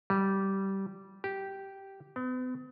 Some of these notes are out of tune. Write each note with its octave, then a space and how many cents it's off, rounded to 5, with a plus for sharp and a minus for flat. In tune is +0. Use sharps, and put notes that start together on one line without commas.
G3 -15
G4 -10
B3 +45